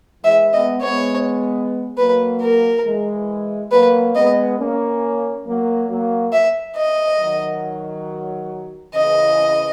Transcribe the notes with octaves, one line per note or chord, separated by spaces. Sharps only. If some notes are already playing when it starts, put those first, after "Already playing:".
E3 G#3 E5
G#3 B3 D#5
G#3 B3 C#5
F#3 A#3 B4
A#4
E3 G#3
F#3 A#3 B4
G#3 B3 D#5
A#3 C#4
F#3 A#3
F#3 A#3
E5
D#5
D#3 F#3
C#3 E3 D#5